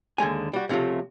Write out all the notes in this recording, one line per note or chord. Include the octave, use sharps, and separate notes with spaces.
D#2 D3 G#3 G#5
G3 F#4
C#2 C3 F3 F#3 A3